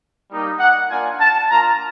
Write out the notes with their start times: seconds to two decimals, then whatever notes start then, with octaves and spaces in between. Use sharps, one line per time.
0.29 G3 A#3 D#4 G4
0.59 F#5
0.89 A#3 D4 F4 G#5
1.20 A5
1.49 A#3 D4 F4 A#5